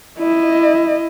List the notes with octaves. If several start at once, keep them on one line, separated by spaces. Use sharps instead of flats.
E4 D#5